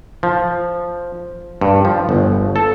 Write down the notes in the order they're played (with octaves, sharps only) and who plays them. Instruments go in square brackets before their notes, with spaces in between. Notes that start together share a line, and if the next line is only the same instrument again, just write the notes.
[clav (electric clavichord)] F3
G2
F3
G1
A4